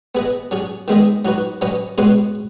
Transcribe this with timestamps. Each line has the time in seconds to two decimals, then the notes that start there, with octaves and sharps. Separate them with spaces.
0.15 B3 G#4 B4 D#5
0.51 F#3 C#4 G#4
0.88 D#3 G#3 B3 G#4 D#5
1.25 F#3 D#4 F#4 B4
1.61 F#3 C#4 B4 D#5
1.98 B2 G#3 C#4 G#4 B4